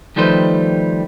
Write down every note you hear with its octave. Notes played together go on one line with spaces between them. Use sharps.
D#3 F3 G3 A3 B4 C5